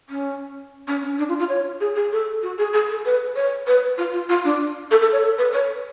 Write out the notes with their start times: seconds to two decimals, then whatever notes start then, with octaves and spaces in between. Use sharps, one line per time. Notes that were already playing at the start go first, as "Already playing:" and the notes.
0.09 C#4
0.87 C#4
1.03 C#4
1.18 D4
1.29 F4
1.39 F4
1.49 C#5
1.80 G#4
1.96 G#4
2.12 A4
2.42 F#4
2.58 G#4
2.74 G#4
2.89 A4
3.05 B4
3.36 C#5
3.67 B4
3.98 F4
4.13 F4
4.29 F4
4.44 D4
4.91 A4
5.01 A4
5.12 C#5
5.23 A4
5.38 B4
5.53 C#5